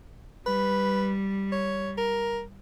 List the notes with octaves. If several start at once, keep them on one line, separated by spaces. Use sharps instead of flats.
G3 B4
C#5
A#4